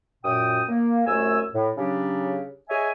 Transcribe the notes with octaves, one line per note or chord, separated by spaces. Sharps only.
F#2 A#2 G5 D#6
A#3
C2 F#2 A3 G#5 E6
A2
C#3 F#3 D4 G4
G#4 C#5 D#5 E5 G#5